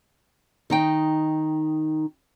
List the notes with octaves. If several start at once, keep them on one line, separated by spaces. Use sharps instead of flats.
D#3 D#4 G5